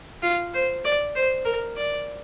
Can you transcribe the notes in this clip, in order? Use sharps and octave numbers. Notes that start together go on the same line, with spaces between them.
F4
C5
D5
C5
A#4
D5